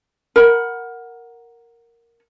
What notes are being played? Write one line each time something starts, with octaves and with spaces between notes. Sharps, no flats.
A#4 F#5 B5